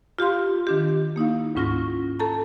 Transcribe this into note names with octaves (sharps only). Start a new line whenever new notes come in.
F4 G4 F5 C6
D#3 D4 G4
A#3 D#4 E4 F5
D2 G#2 C#4 F4 C#6 A#6
A4 A5 A#5